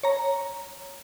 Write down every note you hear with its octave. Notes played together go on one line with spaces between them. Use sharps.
C#5 A#5